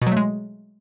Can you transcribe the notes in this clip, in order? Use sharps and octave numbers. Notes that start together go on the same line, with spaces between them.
B2
F#3
A3
G#3